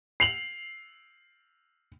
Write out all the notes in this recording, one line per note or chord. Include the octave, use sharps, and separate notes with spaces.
C7 F7 F#7